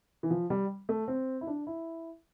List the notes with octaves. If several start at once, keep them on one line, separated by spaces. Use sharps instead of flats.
E3
F3
G3
A3
C4
E4
D4
E4